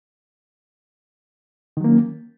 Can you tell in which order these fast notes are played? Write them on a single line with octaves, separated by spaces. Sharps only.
D#3 F#3 A#3 C#4